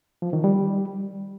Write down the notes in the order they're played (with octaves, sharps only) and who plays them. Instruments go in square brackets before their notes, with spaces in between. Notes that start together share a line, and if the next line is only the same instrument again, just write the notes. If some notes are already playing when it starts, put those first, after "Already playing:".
[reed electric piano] F3
D#3
G3